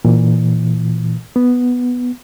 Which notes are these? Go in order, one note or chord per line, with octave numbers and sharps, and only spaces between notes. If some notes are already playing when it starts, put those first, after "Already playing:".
A#2 E3
B3